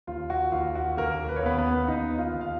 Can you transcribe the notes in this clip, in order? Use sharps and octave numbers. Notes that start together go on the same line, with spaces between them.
D#2 F4
F#4
D#2 F4
F#4
D#2 A#3 A#4
B4
C#5
D#2 B3 B4
B3 B4
D#2 D#4 D#5
F4 F5
D#2
F5